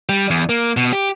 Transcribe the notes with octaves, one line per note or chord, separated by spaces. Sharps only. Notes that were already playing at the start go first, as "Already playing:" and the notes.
G3
E2
A#3
B2
G4